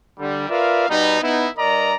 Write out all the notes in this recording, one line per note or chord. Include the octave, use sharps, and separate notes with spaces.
D3 G3
F4 A#4 B4 D5 E5 F5
B2 G3 B3 D#4
B3 D#4 E4
G2 A#4 D5 D#5 A#5